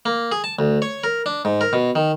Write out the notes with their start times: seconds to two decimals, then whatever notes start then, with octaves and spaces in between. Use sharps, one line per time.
0.06 A#3
0.32 G#4
0.44 A5
0.59 D2
0.82 C#5
1.04 A#4
1.26 D4
1.45 G#2
1.61 A#4
1.73 B2
1.95 D#3